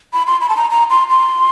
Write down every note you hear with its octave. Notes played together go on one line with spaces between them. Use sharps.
B5
C6
B5
A5
A#5
A#5
C6
C6